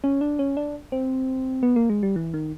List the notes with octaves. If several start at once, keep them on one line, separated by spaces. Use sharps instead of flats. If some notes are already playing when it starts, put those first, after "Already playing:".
C#4
D4
C#4
D4
C4
B3
A#3
G#3
G3
E3
D#3